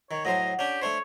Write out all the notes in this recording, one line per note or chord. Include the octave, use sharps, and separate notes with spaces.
D#3 C#5
A2 F#3 C5 D#5 F#5
C#4 D4 G4
A3 D4 C5 C#5